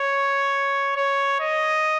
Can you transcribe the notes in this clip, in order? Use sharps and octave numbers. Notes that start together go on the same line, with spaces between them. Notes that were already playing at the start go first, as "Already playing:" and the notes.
Already playing: C#5
C#5
D#5